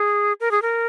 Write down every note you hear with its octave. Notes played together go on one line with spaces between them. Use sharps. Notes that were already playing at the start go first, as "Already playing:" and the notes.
Already playing: G#4
A#4
G#4
A#4